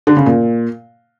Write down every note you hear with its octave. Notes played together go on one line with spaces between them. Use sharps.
D3
C#3
A#2